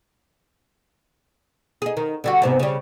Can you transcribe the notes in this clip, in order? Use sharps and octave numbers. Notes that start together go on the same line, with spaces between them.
D#4 G#4
D#3
D3 G3 F#4
G#2 C3 B3
C#3 G3